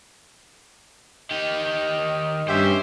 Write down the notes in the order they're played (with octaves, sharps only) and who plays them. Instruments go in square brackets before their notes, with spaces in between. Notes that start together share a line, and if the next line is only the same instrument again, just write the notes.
[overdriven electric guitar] D#3 G4 [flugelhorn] D#5
[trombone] G2 [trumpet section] C#4 G4 E5 [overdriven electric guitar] C5